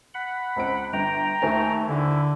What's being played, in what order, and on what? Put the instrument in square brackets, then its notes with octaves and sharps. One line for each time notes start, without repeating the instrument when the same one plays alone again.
[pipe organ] F#5 B5
[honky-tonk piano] C#2 C4 D7
[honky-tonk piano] G1 [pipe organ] G5 A#5
[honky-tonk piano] D#2 C5 G#5 [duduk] A3
[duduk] D3 [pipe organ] E4